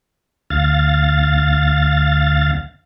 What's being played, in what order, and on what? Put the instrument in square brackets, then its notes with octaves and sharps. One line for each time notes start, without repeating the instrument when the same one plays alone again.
[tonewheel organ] D2 F5 A6